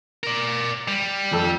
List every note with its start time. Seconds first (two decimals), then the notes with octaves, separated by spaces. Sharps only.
0.24 A#4 D5
0.88 G3
1.31 F2 A4 E6